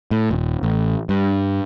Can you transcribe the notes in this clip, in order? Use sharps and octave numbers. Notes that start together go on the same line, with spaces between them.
A2
D#1
A1
G2